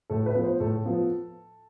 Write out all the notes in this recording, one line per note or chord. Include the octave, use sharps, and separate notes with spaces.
A2 A4
B4
F3 B3
C5
A2 A4
F3 B3